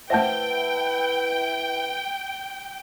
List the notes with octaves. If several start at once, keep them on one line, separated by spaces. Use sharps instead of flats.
A3 E4 B4 C5 E5 F#5 G5 A5